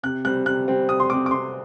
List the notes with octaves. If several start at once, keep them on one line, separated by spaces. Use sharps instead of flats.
C3 F#6
G3 C4 F#6
C3 F#6
G3 C4
C3 D#6
C6
G3 C4 D6
D6
C3 C6